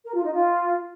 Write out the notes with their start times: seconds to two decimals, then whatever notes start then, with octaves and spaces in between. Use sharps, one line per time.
0.05 A#4
0.14 F4
0.24 D#4
0.33 F4